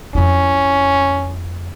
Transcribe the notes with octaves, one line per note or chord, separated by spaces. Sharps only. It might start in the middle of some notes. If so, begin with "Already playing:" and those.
F2 C#4 E4